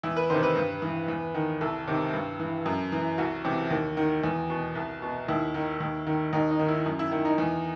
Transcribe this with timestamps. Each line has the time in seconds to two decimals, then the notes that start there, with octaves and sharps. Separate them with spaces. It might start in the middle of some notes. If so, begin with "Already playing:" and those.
0.03 E2 E4
0.16 B4
0.30 C3 D#3 C5
0.43 B4
0.56 G2
0.82 E3
1.08 E2
1.34 D#3
1.61 C2 A4
1.88 C3 D#3
2.14 G2
2.40 E3
2.66 F#2
2.92 E3
3.18 C2 F#4
3.45 C3 E3
3.71 D#2
3.97 D#3
4.24 E2
4.50 B2
4.75 C2
5.02 B2
5.28 D#2 E4
5.54 D#3
5.80 D#2
6.07 D#3
6.33 D#2 D#4
6.51 D#4
6.59 D#3
6.68 E4
6.86 F#2
6.99 E4
7.11 D#3 E4
7.25 D#4
7.38 E2